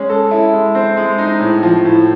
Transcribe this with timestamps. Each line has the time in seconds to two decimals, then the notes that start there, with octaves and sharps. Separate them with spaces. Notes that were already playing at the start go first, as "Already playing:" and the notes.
Already playing: G#3 C#4
0.10 A4
0.31 E4
0.53 G#3
0.75 C4
0.97 G#3
1.18 D#4
1.41 A2
1.63 F3
1.85 A2